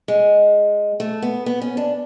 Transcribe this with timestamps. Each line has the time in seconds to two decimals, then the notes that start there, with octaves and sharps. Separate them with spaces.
0.08 G#3
1.00 A3
1.22 B3
1.46 B3
1.62 C#4
1.77 D4